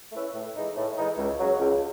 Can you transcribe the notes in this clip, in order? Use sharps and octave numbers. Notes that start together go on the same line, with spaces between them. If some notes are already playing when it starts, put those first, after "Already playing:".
A3 C#4 E4 B4
A2
E3 G#3 D#4
A2
E3 G#3 D#4
C#2
C#3 F#3
C#2